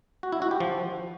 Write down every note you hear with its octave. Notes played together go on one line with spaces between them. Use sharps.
F#4
E4
F#4
G4
F3